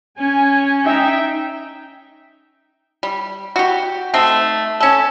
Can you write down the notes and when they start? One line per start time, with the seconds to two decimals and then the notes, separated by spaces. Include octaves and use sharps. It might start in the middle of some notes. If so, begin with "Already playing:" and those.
0.19 C#4 G#5
0.85 D#4 E5 G5
3.03 G3
3.56 F#4 G4
4.14 A3 C4 D#4
4.80 C#4 A4